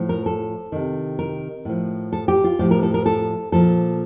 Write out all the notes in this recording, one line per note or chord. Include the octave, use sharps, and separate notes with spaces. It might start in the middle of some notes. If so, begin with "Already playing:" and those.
Already playing: A2 F3
A#4
A4
C3 D#3
A#4
A2 F3
A4
G4
F4
A2 F3 G4
A#4
A4
A#4
A4
A#2 F3 A4